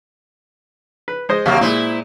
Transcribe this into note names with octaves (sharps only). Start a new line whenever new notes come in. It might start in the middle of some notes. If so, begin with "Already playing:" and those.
B4
G#3 C5 D#5
D#2 C3 F#3 A#3 E5
A#2 G#3 E4 C5